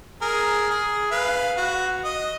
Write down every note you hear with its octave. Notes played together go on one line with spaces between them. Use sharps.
G#4 A#4
G#4
B4 F5
F#4
D#5